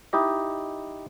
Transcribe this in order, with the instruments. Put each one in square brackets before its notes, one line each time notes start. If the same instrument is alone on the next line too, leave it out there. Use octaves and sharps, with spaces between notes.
[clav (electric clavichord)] D#4 E4 G4 D#5